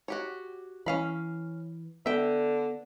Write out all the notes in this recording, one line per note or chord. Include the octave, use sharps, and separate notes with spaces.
F#4 G4 C#5
E3 C#4 F5 B5
D3 B3 E5 G5